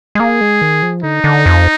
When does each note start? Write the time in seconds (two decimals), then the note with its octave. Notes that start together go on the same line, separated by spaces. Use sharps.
0.15 G#3
0.20 A#3 G#4
0.41 G#3
0.62 D#3
0.83 F3
1.03 D3 D#4
1.24 D3
1.46 F2